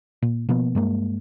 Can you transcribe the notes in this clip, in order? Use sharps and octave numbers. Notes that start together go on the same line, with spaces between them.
A#2
B2 F3 A#3 B3
G2 G#3 A#3